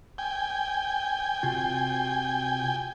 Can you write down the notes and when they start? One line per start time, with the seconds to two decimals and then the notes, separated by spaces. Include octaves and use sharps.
0.18 G5 G#5
1.43 C3 F4 F#4